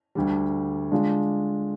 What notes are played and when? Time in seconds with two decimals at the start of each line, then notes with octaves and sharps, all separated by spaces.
0.15 D2 D3 G3
0.92 D3 G#3 D4 F4